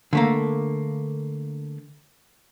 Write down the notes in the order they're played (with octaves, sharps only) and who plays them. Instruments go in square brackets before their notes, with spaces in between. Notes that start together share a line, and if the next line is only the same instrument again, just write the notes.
[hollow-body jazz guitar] D3 A3 A#3